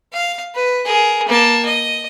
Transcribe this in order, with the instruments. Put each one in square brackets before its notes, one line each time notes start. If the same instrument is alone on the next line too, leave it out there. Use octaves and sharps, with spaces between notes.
[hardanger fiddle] F5
B4
G#4 A#4
A#3 A5
D#5